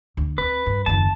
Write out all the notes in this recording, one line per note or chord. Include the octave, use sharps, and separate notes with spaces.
D2
C4 B4
G2
F#1 D#2 A5